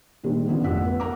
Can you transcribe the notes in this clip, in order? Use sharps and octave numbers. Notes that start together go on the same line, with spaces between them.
A#2 D#3 G3 G#3 C4
D3 D#3 F3 B3 C#4
A1 F2 G4 F#5 E6 B6
B3 B4
A#4 F#5 A#5 D6